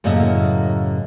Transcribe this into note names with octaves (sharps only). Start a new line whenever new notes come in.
F#2 A2 C#3 A#3 E4 D#5